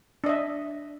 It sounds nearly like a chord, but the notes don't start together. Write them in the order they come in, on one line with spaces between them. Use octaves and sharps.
D4 D#5 E5